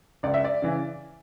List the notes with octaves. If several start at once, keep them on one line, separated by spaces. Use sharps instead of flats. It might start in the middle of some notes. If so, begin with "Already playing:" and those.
C#2 D5
E5
D5
C#3 E3